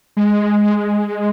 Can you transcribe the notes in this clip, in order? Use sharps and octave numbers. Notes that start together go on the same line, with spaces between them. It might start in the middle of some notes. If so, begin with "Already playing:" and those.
G#3